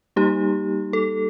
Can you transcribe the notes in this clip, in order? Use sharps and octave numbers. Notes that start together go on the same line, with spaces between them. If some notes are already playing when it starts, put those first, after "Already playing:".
G3 A#3 D#4 G4
A4